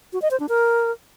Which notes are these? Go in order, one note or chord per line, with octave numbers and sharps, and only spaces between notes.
F#4
D#5
C5
D4
A#4